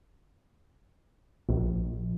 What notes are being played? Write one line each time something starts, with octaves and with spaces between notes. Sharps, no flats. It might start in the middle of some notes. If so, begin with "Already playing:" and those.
A#1